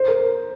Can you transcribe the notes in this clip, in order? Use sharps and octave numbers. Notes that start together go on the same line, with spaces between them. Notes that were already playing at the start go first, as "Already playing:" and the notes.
Already playing: C5
A#4